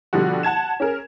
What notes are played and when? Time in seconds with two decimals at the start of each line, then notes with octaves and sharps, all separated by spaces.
0.13 B2 D3 F3 G3 F#4
0.43 F#5 A5 G#6 E7
0.80 C#4 G#4 A#4